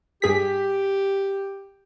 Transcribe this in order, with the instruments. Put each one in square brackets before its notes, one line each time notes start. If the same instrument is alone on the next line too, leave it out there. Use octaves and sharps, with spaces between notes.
[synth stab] G2 G#4 B6 [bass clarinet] G4